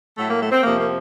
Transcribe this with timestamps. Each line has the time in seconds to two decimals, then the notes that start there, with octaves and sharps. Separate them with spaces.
0.18 A2 F#3 A3
0.29 A#3
0.41 A3
0.52 C4
0.63 F2 C3 F3 A#3
0.79 A#3